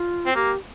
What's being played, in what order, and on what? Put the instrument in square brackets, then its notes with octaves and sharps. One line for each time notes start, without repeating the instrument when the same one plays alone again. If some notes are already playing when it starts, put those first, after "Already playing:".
Already playing: [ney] F4
[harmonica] C4
[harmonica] A#3 [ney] G4